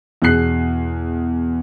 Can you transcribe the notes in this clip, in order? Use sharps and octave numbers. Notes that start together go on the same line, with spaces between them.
E2 B2 G#4 F#6 C7